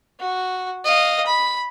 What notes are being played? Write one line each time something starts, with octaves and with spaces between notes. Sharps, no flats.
F#4
D#5 F5
B5